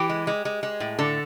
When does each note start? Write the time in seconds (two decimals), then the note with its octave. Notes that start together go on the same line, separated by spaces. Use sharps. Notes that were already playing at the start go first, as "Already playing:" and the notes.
Already playing: E3 G4
0.09 G#3
0.27 G#3
0.45 G#3
0.63 G#3
0.80 A2
0.99 D3 A4